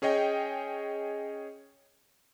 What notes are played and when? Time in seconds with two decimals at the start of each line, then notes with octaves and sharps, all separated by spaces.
0.02 C#4 G#4 C#5 D#5 G5